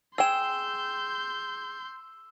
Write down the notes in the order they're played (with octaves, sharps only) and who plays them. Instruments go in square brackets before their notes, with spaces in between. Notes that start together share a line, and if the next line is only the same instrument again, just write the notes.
[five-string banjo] G#4 G5 [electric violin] C6 G6 [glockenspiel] E6 E7